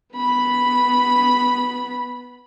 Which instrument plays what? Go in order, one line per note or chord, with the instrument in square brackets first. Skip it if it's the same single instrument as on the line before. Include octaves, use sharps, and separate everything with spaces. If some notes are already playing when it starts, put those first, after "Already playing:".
[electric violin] B3 B5